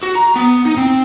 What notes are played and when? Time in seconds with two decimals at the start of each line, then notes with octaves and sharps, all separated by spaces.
0.03 F#4
0.15 A#5
0.36 B3
0.65 D#4
0.77 C4